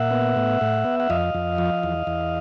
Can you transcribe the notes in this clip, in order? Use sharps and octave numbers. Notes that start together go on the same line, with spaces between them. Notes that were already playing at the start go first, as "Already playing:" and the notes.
Already playing: A#2 E5 F#5
B3
A2
A2
B3
F#5
F2 D#5 F5
F2
F3
E2
E2